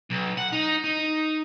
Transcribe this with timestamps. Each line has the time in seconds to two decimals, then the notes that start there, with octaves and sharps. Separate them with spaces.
0.11 B1
0.38 F#5
0.53 D#4
0.84 D#4